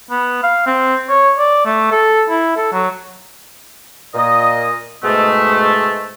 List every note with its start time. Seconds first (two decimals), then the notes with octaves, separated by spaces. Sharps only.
0.10 B3
0.43 F5
0.66 C4
1.09 C#5
1.38 D5
1.66 A3
1.91 A4
2.30 E4
2.57 A4
2.72 F#3
4.14 A#2 D#5
5.03 G#2 B2 G#3 A3